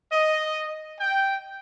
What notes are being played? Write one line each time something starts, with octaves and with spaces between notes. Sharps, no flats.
D#5
G5